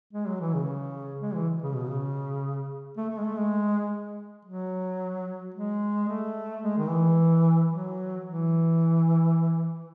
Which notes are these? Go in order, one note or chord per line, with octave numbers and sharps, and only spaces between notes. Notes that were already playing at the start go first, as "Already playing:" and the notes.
G#3
F#3
E3
C#3
G#3
E3
C#3
B2
C#3
A3
A3
G#3
A3
G#3
F#3
G#3
A3
G#3
D#3
E3
F#3
E3